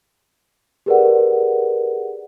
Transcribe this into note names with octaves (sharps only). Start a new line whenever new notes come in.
G4 G#4 A#4 B4 D5 F#5